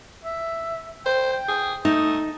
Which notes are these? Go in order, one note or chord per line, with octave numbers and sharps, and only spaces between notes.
E5
C5 G5
G5
G#4
A3 D#4 D#6